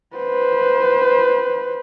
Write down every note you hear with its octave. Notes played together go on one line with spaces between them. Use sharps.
B4 C5